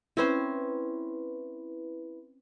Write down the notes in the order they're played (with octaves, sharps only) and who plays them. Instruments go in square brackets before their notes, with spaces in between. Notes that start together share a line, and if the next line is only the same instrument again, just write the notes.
[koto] C4 C#4 C5 [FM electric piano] E4 B4